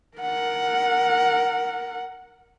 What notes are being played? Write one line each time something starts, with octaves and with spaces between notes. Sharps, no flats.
A#4 F#5